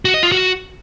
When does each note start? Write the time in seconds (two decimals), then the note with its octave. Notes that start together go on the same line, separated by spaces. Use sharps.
0.05 F#4
0.14 D#5
0.23 F4
0.32 F#4